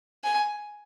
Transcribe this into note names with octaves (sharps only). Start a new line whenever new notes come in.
G#5